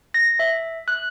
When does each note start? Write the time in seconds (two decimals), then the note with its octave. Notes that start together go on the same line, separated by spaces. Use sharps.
0.14 A#6
0.39 E5
0.88 F#6